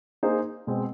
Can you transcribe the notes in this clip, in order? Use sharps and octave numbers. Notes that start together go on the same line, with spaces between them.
A#3 D#4 G#4 C5
B2 G#3 C4